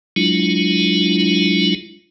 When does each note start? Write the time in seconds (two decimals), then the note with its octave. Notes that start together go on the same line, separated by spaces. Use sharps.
0.16 F#3 G#3 D4 E4 F4